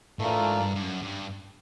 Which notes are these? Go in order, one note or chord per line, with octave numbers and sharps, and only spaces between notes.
A2 E3 A3 D4 F4 A#4
G#2
G2
G2
F#2
G2